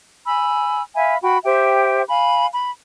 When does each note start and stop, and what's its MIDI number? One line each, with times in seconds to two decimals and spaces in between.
0.25 0.82 80
0.25 0.82 83
0.25 0.82 88
0.95 1.16 76
0.95 1.16 77
0.95 1.16 80
0.95 1.16 83
1.21 1.38 66
1.21 1.38 79
1.21 1.38 83
1.43 2.03 67
1.43 2.03 72
1.43 2.03 76
1.43 2.03 79
2.08 2.46 77
2.08 2.46 80
2.08 2.46 83
2.53 2.71 83